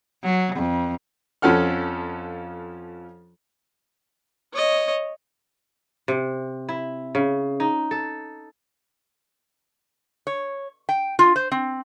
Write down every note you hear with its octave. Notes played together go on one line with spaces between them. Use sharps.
F#3
F2
F2 F3 C#4 A4 F#5 F6
C#5 D#5
C3
E4
C#3
D#4
A4
C#5
G5
F4
C5
C4